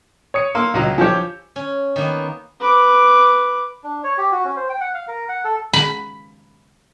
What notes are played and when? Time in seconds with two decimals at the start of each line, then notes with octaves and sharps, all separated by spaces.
0.34 C#5 D#6 C#7
0.55 A#3 F5 C6 E6
0.74 C#2 F#3 D#5
0.98 F3 G4 C#5 G#5 G6
1.56 C#4
1.96 D#3 A#3 B3
2.60 B4 D6
3.84 D4
4.04 C#5
4.18 G4
4.32 F#4
4.45 C#4
4.57 C5
4.69 G5
4.81 F#5
4.94 F5
5.08 A#4
5.29 F#5
5.44 A4
5.73 B5